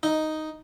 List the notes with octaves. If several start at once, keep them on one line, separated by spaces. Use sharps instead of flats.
D#4